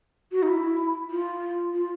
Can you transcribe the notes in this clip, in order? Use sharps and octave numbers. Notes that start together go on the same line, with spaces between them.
F#4
D#4
E4
F4
F4